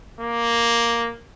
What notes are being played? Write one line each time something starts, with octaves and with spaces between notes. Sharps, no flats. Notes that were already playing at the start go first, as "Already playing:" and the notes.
A#3